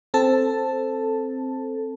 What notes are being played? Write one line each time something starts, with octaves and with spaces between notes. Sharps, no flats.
C4 A4 A5